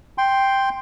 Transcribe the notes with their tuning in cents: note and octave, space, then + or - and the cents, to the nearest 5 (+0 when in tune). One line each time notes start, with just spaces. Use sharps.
G5 +0 C6 +0